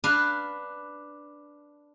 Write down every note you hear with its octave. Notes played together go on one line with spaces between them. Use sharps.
D4 B4 F5